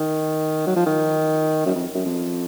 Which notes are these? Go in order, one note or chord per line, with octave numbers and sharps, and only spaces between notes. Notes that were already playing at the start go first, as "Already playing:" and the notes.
Already playing: D#3
F#3
F3
D#3
F#2
F2
F#2
F2